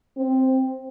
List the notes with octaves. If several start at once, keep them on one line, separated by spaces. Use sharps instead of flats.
C4